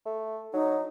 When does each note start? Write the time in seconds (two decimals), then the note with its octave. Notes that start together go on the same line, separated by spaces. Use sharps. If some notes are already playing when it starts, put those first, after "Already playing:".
0.06 A3
0.54 F#3 D#4